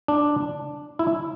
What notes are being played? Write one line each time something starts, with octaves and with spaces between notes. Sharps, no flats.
D4
E4